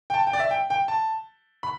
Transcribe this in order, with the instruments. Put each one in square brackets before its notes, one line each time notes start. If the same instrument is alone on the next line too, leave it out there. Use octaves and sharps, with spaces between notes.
[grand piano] G5
A5
G5
D5
E5
G5
G5
A5
B5